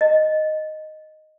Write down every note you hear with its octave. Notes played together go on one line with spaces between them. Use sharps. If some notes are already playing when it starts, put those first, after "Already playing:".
D#5